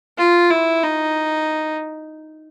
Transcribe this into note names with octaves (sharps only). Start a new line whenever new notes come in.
F4
E4
D#4